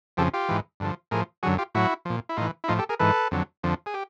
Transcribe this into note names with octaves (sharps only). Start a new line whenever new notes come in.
F2 C#3 F3 G4 A4
F4 G4
G#2 E3
G2 D3 F3
A2 F3 G#4 A#4
F#2 D3 F#3 F#4 G#4
F4 G4
A2 F#3 E4 F#4
A#2 F3
E4
A2 E3 D#4 F4
E4
A2 F3 D#4 F4
G4 A4
G#4 A#4
G#2 E3 A4 B4
F2 D3 F#3
F2 D3 F3
G#4
G4